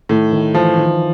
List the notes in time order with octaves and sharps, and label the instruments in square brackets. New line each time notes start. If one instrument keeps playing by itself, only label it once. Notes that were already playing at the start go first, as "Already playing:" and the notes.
[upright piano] A2 [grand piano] D#3
[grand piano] D#3
[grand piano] E3 [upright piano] F3
[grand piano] D#3